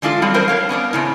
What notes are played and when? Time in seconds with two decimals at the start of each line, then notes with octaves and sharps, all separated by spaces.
0.02 D3 G#3 D4 F4 A4
0.22 F#3 G3 C4
0.34 G3 C4 A#4 C5
0.48 D4 C#5 F5
0.69 B3 C#4 D4 A#4
0.93 A2 C#3 C4